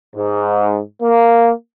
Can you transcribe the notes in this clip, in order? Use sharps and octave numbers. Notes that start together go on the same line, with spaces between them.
G#2
A#3